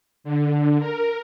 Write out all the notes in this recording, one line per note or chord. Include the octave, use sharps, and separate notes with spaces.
D3
A#4